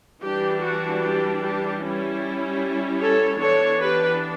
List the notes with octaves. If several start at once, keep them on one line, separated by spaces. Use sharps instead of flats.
E3 G3 D4 G4
F#4
G4
G4
G3 C#4 E4
A4 C#5
E3 B3 D4 A4 C#5
G4 B4